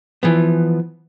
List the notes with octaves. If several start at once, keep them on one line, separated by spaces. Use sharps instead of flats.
E3 F3 B3